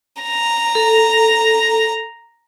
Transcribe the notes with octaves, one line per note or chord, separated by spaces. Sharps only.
A#5
A4